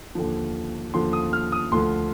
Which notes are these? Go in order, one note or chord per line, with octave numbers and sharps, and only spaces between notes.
D#2 D3 F3
D#2 D3 F3 C6
D#6
F6
D#6
D2 D3 F3 C6